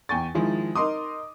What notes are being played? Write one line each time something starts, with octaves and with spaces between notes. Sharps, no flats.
E2 G5 G#5 C#6 A6
D#3 F3 G#3 E4
D#4 A#4 D#5 C6 D6 D#6